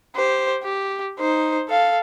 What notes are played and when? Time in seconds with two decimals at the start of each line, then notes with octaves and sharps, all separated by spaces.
0.16 G4 C5
0.63 G4
1.20 D#4 C5
1.69 A4 F5